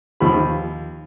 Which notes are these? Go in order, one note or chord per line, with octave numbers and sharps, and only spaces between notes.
D#2 F3 B5